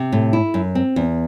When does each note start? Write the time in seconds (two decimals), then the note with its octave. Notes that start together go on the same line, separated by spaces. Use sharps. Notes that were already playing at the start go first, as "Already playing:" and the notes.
Already playing: C3
0.12 A2
0.33 E4
0.54 F#2
0.75 C4
0.96 E2